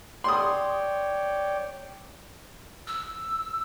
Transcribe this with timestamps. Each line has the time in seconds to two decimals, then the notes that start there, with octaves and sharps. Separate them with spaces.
0.24 C#5 D5 G5 C6 D#6
2.87 E6